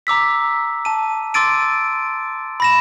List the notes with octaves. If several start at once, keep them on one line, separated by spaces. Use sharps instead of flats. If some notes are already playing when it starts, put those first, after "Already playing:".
A#5 D6 E6 B6
A5 D#7
C6 D6 E6 A6 D7 D#7
B5 A#6 E7